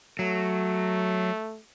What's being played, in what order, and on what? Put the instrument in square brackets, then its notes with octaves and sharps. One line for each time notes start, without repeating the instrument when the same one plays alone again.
[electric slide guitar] F#3 [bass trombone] A3